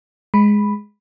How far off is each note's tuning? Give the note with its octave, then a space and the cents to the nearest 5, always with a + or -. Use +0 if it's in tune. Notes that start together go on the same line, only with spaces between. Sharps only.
G#3 +0 B5 +0